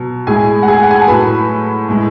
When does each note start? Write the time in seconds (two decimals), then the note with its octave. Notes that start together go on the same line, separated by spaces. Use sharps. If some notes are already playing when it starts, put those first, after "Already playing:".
Already playing: B2 F#3
0.27 A2 G#3 G#4 G#5
0.63 F#5
0.68 G#4 G#5
0.83 F#5
0.90 G#5
1.00 A5
1.07 A2 F#3 B4 B5
1.88 A2 G#3